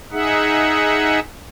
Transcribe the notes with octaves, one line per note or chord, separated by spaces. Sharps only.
D#4 G#4 E5 F#5